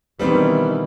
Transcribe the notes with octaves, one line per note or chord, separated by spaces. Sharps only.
B2 D#3 E3 G3 B3 C4